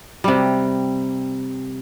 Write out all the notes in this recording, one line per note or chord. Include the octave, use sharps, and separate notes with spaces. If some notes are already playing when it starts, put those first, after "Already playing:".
C3 G3